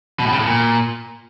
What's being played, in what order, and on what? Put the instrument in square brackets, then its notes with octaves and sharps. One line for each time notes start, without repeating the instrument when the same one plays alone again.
[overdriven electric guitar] B2
A2
C#3
A2
A#2